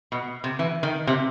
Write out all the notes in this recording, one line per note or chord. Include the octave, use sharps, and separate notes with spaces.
B2
C3
E3
D#3
C3